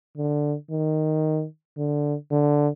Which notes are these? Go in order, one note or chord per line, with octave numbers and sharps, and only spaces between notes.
D3
D#3
D3
D3